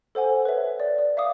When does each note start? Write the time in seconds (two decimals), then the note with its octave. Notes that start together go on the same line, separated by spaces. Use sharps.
0.15 A4 C5 F#5 G#5
0.45 B4 C#5 E5
0.80 D5
0.98 D5
1.17 E5 F5 D6 D#6